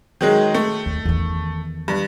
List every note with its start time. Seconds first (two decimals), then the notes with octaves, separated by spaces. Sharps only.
0.21 D#3 F#3 G#3
0.54 A3
0.86 D#2
1.05 E2 D#3
1.88 G2